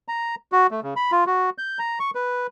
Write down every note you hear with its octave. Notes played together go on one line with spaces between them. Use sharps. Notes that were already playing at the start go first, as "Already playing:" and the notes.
A#5
F#4
A3
C#3
B5
F4
F#4
G6
A#5
C#6
B4